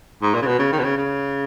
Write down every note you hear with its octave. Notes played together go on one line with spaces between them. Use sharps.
G#2
A#2
C#3
B2
C#3
D#3
B2
C#3
C#3